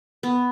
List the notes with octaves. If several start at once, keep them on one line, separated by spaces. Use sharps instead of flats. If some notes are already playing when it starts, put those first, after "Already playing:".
B3